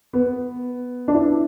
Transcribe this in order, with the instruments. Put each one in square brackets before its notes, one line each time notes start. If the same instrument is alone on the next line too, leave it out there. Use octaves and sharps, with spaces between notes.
[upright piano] B3
D4
E4